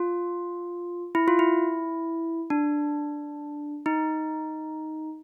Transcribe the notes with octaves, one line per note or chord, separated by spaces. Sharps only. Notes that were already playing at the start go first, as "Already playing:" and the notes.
Already playing: F4
E4
F4
E4
D4
D#4